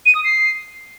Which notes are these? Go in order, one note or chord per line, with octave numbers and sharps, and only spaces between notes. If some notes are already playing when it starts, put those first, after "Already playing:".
D#7
D#6
C7